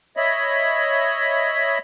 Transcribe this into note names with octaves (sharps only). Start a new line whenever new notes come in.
C#5 D#5 E5 B5